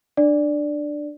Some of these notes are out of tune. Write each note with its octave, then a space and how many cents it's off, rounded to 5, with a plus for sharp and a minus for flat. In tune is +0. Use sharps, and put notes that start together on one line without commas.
D4 +20 D5 -5